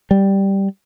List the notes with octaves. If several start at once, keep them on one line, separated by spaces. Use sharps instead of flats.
G3